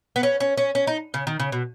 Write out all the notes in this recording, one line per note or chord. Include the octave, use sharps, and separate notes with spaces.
B3
C#4
C#4
C#4
C#4
D#4
C#3
D#3
C#3
B2